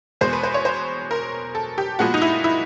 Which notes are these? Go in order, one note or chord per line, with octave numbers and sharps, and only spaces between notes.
E2 B2 G#3 C5
B4
C5
C#5
C5
A#4
A4
G4
A#2 F3 G#3 B3 F#4
D#4
E4
E4